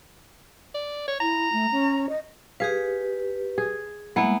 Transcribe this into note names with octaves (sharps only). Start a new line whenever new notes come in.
D5
C#5
E4 A#5
A3
C#4
D#5
G4 G#4 B4 F5
G#4
G3 G#3 A#3 B3 E4